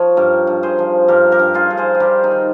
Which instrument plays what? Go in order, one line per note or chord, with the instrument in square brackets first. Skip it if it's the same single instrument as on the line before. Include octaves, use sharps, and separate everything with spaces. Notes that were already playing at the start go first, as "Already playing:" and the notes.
Already playing: [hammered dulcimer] F3 C#5
G2 G4 A#4
G2
G#4 C5
F3
G2 G4 A#4
G4 A#4
G2
F4 G#4
G2
G#4 C5
G#4
G3 G4 A#4
D#4
D#3